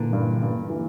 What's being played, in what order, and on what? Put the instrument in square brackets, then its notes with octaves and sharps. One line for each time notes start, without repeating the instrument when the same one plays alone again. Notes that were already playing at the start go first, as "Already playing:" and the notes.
Already playing: [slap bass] A#2 D3 [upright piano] E3 A#3
[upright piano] G2
G2
E3